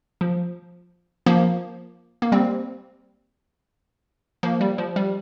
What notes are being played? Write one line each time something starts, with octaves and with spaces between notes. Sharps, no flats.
F3
F3 A#3
A#3
G3 C4
F3 A#3
G3
F3
G3